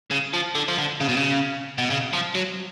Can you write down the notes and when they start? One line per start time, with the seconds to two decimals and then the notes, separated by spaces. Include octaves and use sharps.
0.11 C#3
0.34 F3
0.55 D3
0.68 F3
0.78 D3
1.01 C#3
1.09 B2
1.17 C#3
1.78 B2
1.90 C#3
2.13 F3
2.35 F#3